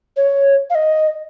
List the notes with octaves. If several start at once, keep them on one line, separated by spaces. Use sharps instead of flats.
C#5
F5
D#5